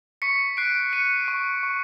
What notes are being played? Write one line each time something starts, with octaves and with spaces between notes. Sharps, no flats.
C#6 B6 C#7
F#6 C7 D7
F#6 C#7 D#7
C#6
C#6